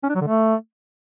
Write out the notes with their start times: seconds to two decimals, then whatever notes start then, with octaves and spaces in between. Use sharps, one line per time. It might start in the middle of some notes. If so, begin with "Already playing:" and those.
0.04 C#4
0.09 D4
0.15 F#3
0.21 D3
0.27 A3